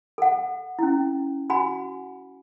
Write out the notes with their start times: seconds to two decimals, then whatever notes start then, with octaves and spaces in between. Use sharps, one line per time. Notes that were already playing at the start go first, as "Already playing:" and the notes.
0.18 A4 F#5
0.79 C#4 E4
1.50 F#4 F#5 G#5 B5